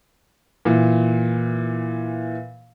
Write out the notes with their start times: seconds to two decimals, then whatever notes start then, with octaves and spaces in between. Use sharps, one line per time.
0.65 A#2 E3